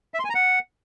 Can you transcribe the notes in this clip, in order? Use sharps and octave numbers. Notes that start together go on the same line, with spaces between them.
E5
C6
G#5
A#5
F#5